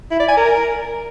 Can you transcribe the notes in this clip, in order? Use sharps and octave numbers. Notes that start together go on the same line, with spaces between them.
E4
D5
G#5
A#4